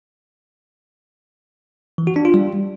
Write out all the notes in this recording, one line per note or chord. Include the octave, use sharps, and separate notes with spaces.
E3
F#4
D4
F4
G3